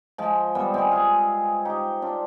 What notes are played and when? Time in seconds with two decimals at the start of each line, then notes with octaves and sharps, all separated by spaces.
0.18 F3 G#3
0.55 G3 B3
0.74 G#3 C4
0.92 F4 G#4
1.65 D#4 G4
2.02 D4 F4